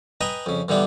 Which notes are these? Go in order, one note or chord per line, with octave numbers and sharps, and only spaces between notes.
B4 D#5 G5 G#5 A#5 B5
F2 C#3
G2 D3 E3 G3 B3 D4